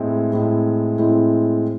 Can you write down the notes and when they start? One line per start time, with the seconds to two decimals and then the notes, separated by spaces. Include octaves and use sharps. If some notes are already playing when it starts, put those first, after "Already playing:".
Already playing: A2 G#3 C4 E4
0.33 A2 G#3 C4 E4
0.98 A2 G#3 C4 E4